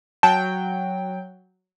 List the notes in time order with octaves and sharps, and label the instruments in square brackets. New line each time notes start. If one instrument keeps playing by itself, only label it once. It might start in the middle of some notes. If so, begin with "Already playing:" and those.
[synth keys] F#3 G5 [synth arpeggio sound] A5